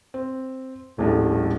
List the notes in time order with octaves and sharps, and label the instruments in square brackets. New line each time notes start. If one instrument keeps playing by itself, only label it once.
[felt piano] C4
[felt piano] D#1 A#1 G3 [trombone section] A2